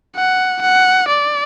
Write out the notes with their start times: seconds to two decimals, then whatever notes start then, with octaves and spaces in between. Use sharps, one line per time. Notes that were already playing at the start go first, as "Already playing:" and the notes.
0.16 F#5
0.62 F#5
1.09 D5